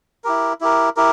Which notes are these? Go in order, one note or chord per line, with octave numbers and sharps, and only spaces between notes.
E4 G4 A#4
E4 G4 A#4
E4 G4 A#4